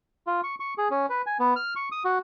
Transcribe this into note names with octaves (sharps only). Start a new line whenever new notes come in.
F4
C#6
C#6
G#4
C#4
B4
G#5
B3
F6
C#6
D#6
F#4